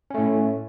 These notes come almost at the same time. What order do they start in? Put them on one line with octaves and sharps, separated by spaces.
C#4 A3 A2